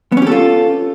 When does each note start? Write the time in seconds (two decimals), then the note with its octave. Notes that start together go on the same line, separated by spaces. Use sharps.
0.12 B3
0.17 C#4
0.22 G4
0.27 A4
0.32 F4